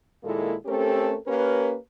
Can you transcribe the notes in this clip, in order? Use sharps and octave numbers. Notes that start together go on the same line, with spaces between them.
D#2 A#2 G#3 A#3 E4 A4
A3 C4 C#4 G4 A4 A#4
A#3 C#4 G4 A#4 B4